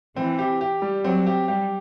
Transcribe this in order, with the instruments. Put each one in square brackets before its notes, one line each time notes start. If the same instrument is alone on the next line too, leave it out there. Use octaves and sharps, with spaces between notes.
[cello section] E3 [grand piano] C4
[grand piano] G4
G4
G3
[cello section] F#3 [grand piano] C4
[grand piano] G4
[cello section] G3 [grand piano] G4